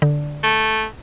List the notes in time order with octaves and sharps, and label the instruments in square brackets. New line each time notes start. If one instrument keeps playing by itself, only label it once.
[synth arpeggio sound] D3
[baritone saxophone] A3